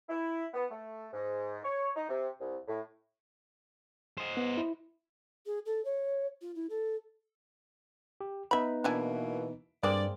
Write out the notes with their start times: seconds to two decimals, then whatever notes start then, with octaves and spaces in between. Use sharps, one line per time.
0.09 E4
0.54 B3
0.70 A3
1.13 G#2
1.64 C#5
1.96 D#4
2.09 C3
2.40 C2
2.67 A2
4.18 C5 D#5
4.37 B3
4.57 E4
5.46 G#4
5.65 A4
5.85 C#5
6.41 F4
6.55 E4
6.69 A4
8.21 G4
8.51 B3 D#4 B4 E5 B5
8.84 B2 E3 A#3 D4 E4 G#5
9.83 G2 G#3 A#3 C4 D5